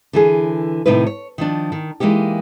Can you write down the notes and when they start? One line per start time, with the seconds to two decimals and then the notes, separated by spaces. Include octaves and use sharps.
0.13 D3 E3 G#4
0.86 A2 C3 D#3 D#4 E4 B4
1.07 C#5
1.38 D#3 F3 D4
1.72 D#3
2.00 E3 G#3 A#3 D#4 G4